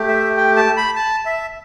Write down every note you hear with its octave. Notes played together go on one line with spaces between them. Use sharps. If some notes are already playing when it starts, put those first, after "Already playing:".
Already playing: A3 G4
E5
G5
A5
B5
A5
E5